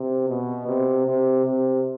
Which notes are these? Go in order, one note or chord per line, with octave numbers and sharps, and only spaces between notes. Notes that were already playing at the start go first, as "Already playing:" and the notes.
Already playing: C3
B2
C3
C3
C3